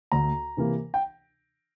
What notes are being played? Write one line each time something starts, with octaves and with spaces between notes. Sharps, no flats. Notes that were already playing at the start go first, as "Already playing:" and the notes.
D2 A#5
C3 E3 A#3
G5